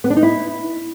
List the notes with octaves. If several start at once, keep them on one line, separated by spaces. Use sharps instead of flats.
B3
D4
D#4
E4